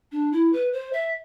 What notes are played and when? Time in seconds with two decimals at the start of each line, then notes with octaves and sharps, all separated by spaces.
0.12 D4
0.32 E4
0.53 B4
0.73 C5
0.93 E5